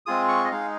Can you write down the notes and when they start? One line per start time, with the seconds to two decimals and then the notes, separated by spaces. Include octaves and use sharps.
0.06 G#3 C4 F4 G#4 D#6
0.28 C#6
0.44 D#5
0.51 G#3 D#4 G#4 F5